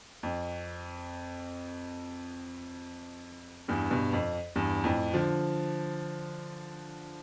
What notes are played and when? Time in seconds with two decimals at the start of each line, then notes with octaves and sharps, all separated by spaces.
0.23 F2
3.68 E2 G2
3.91 G2 B2
4.13 F2
4.56 E2 G2
4.84 F2 A2
5.14 D3 F3